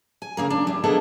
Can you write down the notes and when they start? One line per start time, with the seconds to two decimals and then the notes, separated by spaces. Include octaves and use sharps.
0.22 G#5
0.37 C#3 A#3 A#4
0.50 D4
0.67 E3 G3
0.83 A#3 B3 D4 G#4 A4 D#5